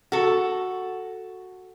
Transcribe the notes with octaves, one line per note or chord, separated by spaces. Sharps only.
F#4 A4